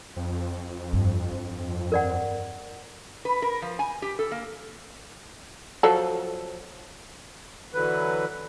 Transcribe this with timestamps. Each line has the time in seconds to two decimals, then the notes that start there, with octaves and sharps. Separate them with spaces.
0.16 F2
0.93 G2
1.92 A#4 D5 F#5
3.25 B4
3.42 A#4
3.62 F3
3.79 G#5
4.02 G4
4.19 A4
4.31 A#3
5.83 F3 F#3 A4
7.74 D3 E3 F#3 B4